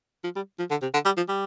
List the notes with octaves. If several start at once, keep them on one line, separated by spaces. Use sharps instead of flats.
F3
G3
F3
D3
C3
D3
G3
F3
G3